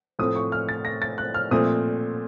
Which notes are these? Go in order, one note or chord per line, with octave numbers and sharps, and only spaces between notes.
A2 F3 A3 C4 D#6
C#6
F6
A6
A#6
A6
F#6
F6
A#2 F3 A3 C4 D#6